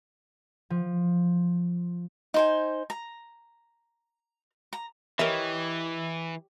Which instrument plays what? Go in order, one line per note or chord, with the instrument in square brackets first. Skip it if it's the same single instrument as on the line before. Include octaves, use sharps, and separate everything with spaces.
[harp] F3
[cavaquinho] D#4 C5 G#5
A#5
A#5
[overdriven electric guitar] E3 [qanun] G4 C#5 D#5 [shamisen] A#4 E5